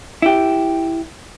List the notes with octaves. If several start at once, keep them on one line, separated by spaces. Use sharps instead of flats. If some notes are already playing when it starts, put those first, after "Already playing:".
E4 G4